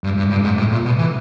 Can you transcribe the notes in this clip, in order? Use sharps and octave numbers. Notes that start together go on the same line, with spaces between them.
G2
G2
G2
G#2
A2
A#2
B2
E3